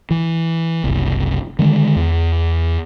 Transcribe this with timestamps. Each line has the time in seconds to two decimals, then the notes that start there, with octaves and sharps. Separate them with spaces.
0.11 E3
0.84 F#1 C2
1.59 D3 D#3 G#3
1.96 E2